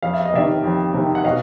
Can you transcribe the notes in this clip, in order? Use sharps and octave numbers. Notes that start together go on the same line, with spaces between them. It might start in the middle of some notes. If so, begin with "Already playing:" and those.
F2 F5
E5
D#5
C3 D#3 D5 E5
F2
C3 D#3
F#5
B2 D#5 F5